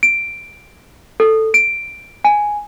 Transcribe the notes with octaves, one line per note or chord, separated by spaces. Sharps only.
D7
A4
D7
G#5